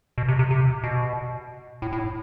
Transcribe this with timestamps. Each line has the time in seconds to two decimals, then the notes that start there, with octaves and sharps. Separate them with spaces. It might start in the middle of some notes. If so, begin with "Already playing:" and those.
0.18 B2
0.28 C3
0.39 C3
0.51 C3
0.84 B2
1.82 A2
1.92 A2